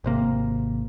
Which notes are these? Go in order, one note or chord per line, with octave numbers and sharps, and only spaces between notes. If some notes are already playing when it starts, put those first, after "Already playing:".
G#1 C3 A#3